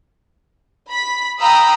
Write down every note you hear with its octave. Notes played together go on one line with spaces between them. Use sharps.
B5 B6
F5 G5 A#5 B5 D#6 E6